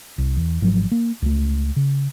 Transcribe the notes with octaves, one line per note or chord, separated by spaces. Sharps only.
C2
E2
G#1 G#2 F3 F#3
A#3
C#2 A3
C#3